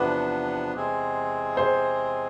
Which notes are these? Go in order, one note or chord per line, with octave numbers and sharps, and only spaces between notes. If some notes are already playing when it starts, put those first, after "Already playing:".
Already playing: E2 C3 F3 B3 D4 B4
E2 C3 G#3 C4 G#4
C5